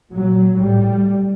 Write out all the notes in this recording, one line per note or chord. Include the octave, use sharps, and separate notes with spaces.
A#2 F#3
A2 G3